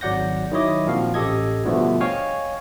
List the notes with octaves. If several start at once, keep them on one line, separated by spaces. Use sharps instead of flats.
G#1 F#3 D5 F#5 G6 A#6
D#3 F#3 E4 C#5 D#5 D6
A#2 F3 C4 F#4 F5
A1 G4 A4 D#5 G#6
B2 D3 F3 G3 A3 B3
C#5 D#5 F5 G5 G#5